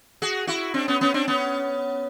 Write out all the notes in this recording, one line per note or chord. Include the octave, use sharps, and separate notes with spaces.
F#4 G#4
E4 F#4
C4 D4
B3 C#4
B3 C#4
C4 D4
B3 C#4